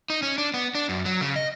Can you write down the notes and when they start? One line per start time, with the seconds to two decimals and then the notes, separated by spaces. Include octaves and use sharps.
0.10 D#4
0.22 C#4
0.38 D4
0.54 B3
0.75 D4
0.89 F#2
1.06 F#3
1.21 C#3
1.36 D#5